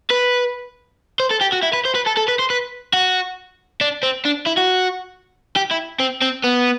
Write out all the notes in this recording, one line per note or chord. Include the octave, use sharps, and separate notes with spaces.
B4
C5
A4
G4
F#4
E4
B4
C5
B4
A4
A4
B4
C5
B4
F#4
D4
C4
D4
E4
F#4
G4
E4
C4
C4
B3